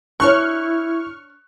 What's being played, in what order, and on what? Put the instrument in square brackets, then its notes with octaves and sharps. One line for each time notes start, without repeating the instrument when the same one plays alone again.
[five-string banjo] D4 C#5 [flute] E4 [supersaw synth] C#6 F6 [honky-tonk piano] F#6